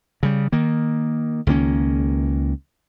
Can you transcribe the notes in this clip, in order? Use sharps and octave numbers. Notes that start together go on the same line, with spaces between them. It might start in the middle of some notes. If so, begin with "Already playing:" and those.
C#3 G3
D#3 A#3
C#2 D#3 A#3 C#4